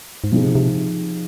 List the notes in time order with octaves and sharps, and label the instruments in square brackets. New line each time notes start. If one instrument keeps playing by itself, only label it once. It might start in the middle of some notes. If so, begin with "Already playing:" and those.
[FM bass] G#2
[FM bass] B2 [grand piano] F3 C4 D#4 G#4
[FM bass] C3
C3